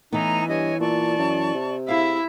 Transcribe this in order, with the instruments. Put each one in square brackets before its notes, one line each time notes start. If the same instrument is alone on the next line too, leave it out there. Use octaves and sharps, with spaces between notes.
[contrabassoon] A2 [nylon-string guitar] E3 B3 [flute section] D#4 G#5 A#5
[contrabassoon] G2 [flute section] C#5 D#5 G#5
[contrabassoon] A#2 [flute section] D5 A5 C#6
[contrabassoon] F#2
C3
[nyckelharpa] E4 E5 [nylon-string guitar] G#4 F5